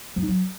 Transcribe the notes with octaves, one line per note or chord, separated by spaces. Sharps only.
F3
D#4
F#3